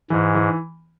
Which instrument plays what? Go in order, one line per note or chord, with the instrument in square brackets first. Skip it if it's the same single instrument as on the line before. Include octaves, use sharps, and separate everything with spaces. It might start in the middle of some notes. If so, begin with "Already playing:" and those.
[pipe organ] G#2 [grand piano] E3
[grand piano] E3